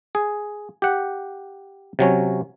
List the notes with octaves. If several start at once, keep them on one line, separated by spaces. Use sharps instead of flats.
G#4
G4 F#5
C3 F#3 C#4 C#5